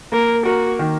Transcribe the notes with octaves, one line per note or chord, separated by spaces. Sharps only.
A#3 A#4
F#4 A#4
D#3